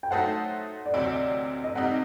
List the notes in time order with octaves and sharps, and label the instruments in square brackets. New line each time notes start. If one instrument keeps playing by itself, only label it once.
[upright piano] G5
[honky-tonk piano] F#3 A3 D#4 A4 C5 [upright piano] F#5
[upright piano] D5
[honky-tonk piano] D2 C3 F#3 C4 [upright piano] D#5
[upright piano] D#5
[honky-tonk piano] C3 G3 C4 D#4 [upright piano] F#5